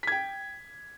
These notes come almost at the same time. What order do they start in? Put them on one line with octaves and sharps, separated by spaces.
B6 G#6 G5